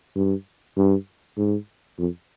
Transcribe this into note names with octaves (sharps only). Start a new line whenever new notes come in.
G2
G2
G#2
F2